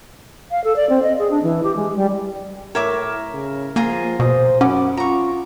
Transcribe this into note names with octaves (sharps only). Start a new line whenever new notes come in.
F5
A4
D5
C4
D#5
G#4
D4
E3
G4
G#3
G3
A2 A#4 C#5 E5 D6
C#3
F3 A#3 F4 G#4 A#5
B2 C5 D#6
F#2 C#4 F#5 B5 D6
F4 A#5 C#6